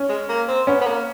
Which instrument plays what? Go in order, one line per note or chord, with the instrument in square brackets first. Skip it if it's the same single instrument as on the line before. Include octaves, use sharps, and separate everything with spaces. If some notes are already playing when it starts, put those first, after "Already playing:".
Already playing: [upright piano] C#4
[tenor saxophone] G#3
A#3
C4
[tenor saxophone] B3 [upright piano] C#4
[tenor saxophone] B3
A#3